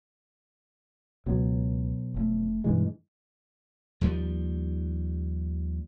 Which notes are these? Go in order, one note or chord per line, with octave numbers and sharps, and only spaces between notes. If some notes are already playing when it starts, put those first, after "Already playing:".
C#2 B2 F#3
F1 G#2 A3
G2 B2 D#3 E3 G#3
D#2 F3 G3